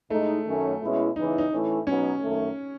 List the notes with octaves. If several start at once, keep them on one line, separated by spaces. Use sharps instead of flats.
A2 G#3 A3 D#4
F#2 D#3 A3 C#4
B2 G#3 C#4 E4
E2 C#3 E3 D#4
D#4
A2 E3 A3 C#4 E4
B2 F#3 B3 C#4 D#4
F#2 D#3 A3